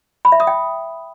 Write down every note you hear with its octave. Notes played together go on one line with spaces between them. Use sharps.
B5
E5
D#6
G5